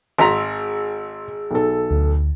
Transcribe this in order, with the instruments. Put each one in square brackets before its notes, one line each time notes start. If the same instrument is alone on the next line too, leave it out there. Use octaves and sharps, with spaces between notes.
[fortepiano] G#1 A#5 [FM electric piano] G#4 E6 [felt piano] C6 B6
[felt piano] B1 A4
[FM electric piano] D2